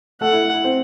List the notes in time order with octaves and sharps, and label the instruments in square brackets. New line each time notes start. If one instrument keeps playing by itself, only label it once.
[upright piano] A3 A4 [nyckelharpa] F#5
[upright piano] E4
E4
E4
C4 C5